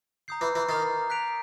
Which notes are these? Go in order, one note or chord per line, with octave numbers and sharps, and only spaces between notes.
A#5 D#6 G6 C7
E3
E3
D#3 A#5 D6 F6 A6 C7
F#6 B6 D7 F7